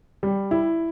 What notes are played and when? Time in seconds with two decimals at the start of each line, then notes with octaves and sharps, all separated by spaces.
0.23 G3
0.51 E4